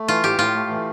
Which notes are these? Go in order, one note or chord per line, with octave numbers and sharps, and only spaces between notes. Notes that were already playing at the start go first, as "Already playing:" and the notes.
Already playing: A3
E3 F4
A2 G4
A2 F4
A3
E3